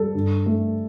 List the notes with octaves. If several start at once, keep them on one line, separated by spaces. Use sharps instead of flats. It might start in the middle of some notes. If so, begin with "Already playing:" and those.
Already playing: G3 A4
G2
A3